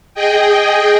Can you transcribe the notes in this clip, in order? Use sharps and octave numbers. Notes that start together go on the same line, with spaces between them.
G#4 D#5 G5